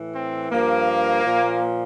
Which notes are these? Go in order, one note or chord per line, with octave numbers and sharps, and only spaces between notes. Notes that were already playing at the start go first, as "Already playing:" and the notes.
Already playing: A2 E3
C4
G2 F3 A#3
A#2 F3